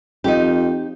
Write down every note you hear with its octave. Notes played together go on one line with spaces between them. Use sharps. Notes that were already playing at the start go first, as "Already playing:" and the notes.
F2 D#4 G4